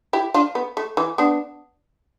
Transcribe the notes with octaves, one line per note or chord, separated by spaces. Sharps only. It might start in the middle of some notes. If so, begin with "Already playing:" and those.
E4 G4
D4 F4
B3
A3
E3
B3 D4